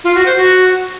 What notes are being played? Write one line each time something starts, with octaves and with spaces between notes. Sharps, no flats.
F4
F#4
C5
F#4